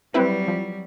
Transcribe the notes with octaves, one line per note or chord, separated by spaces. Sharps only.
F#3 G3 C4 E4 B4
F3